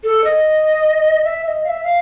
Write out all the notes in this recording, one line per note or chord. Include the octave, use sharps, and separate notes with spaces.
A4
D#5
E5
E5
D#5
F5
E5
F5